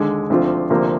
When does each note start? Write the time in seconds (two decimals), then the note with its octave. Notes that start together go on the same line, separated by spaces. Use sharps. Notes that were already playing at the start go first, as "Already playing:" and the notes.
Already playing: D#2 D3 G#3
0.30 D2 D3 F3 C4 F4
0.70 D2 C3 F3 A#3